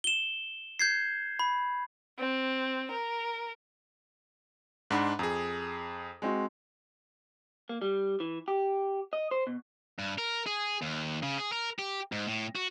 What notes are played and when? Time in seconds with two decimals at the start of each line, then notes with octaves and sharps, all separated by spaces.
0.04 E7 G7
0.79 G6 G#6 C7
1.39 B5
2.19 C4
2.91 A#4
4.90 G#2 D4 F#5 B5 C6
5.19 F2 G#4 A#5 D#6
6.22 G#3 C4 F#4
7.69 A#3
7.82 G3
8.20 E3
8.48 G4
9.13 D#5
9.31 C5
9.47 B2
9.99 G2
10.18 A#4
10.46 G#4
10.82 D#2
11.23 C#3
11.38 G#4
11.52 A#4
11.79 G4
12.12 G#2
12.27 A2
12.55 F#4